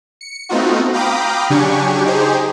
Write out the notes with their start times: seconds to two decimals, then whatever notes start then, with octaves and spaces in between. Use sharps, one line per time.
0.21 C#7
0.49 A3 B3 C4 D#4 F4 F#4
0.93 F5 G5 A#5 B5 D6 D#6
1.50 C#3 F#3 D4 G4 G#5 C#6
2.05 D#4 G4 G#4 C5